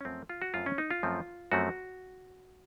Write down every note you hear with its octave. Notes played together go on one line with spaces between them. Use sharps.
C#4
F#2 F3 A3 C4
F4
F#4
F#2 F3 A3 C4 F4
C#4
D#4
F4
F#2 F3 A3 C4
F#2 F3 A3 C4 F#4